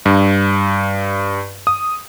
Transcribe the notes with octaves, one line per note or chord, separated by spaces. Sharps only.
G2
D#6